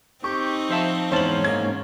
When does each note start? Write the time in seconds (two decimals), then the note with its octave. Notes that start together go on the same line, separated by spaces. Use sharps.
0.24 C4 D#4 G4 C#6
0.70 F3 C5 E5 A5
1.12 E2 G#2 C#4 C5 A5 F#7
1.44 G#2 A#3 G#6